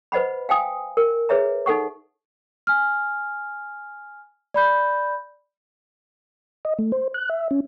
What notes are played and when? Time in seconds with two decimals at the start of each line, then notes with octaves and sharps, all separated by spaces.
0.12 B4 C5 D#5 F#5 B5
0.49 F5 G5 G#5 D#6
0.97 A#4
1.29 G#4 B4 C#5 E5 A#5
1.66 D#4 A4 F#5 C#6
2.67 G#5 F6
4.54 D5 B5 G6
6.65 D#5
6.79 A3
6.92 C5
7.14 F#6
7.29 E5
7.51 C#4